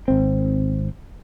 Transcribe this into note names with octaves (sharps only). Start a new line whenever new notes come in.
G#1 C4